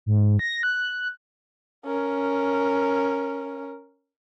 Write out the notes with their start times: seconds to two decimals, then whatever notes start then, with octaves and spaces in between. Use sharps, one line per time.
0.06 G#2
0.39 A#6
0.63 F#6
1.86 C#4 A#4